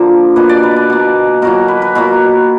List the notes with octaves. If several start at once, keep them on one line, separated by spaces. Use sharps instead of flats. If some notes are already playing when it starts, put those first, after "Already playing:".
Already playing: D3 F3 A#3
B2 A#3 B4
D5
B4
B4
B2 A#3
B2 F#3 A#3 A#4
B4
B4
B2 F#3 A#3 A#4